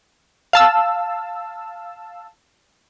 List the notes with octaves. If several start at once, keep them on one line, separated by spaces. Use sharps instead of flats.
F5 A5 E6